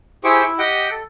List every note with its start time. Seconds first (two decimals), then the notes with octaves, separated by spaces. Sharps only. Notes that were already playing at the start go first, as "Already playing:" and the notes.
0.24 E4 G4 G#4 C5 G5 C#6
0.43 E4
0.59 G4 D#5 F#5 G5
0.91 A4